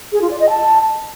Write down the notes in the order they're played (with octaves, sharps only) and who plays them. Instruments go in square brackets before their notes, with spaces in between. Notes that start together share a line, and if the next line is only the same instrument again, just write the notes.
[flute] G#4
F4
D5
D#5
A5